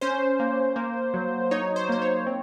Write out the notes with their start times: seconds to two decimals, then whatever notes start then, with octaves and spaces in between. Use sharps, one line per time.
0.01 C#4 C5
0.40 A#3
0.76 A#3
1.14 F#3
1.51 D#4 C#5
1.76 C5
1.89 A#3 C5
2.02 C#5
2.27 C4